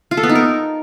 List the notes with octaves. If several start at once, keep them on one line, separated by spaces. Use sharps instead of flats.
F4
A4
B3
D#4
A#4